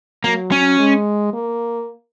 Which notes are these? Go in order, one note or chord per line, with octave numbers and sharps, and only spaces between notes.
F#3 A#3
C#4
G#3
A#3